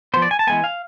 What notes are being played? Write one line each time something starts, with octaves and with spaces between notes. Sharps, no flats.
F3 B3 C5
D5
G#5
A5
E3 G#3 B3 G#5
F5